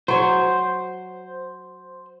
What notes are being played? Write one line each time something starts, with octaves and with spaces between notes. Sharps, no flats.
F#3 C5 C#5